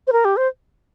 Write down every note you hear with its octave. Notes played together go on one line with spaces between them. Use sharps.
C5
A#4
G4
C5